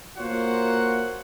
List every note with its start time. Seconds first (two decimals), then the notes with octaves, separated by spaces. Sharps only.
0.18 A#3 F4 F#4 C5 C#5 F#5